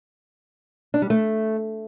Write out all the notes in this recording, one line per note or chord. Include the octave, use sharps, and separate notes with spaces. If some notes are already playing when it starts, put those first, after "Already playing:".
D4
G3
A3